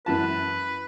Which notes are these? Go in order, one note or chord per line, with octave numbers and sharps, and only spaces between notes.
F#2 E3 B4 A5